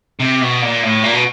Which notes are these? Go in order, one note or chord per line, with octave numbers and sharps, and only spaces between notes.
C3
B2
A#2
A2
A#2
B2